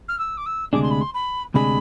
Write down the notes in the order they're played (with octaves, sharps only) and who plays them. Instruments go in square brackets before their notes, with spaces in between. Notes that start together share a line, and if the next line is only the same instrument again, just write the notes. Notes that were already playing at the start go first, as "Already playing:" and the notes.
[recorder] F6
E6
D6
E6
[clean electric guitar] D2 C3 G#3 D4 G#4 [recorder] D6
[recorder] C6
B5
C6
B5
[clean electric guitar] D2 C3 G#3 D4 G#4 [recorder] B5